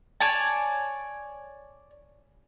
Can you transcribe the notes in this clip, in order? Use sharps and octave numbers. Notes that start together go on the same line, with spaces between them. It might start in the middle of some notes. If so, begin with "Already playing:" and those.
C#5 D5 G#5 A5